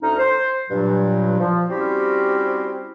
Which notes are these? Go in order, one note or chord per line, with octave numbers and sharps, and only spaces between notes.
D2 A3 C#4 D#4
C5
G2 A#2 F#3
F3
G3 C4 C#4 E4 F#4 G4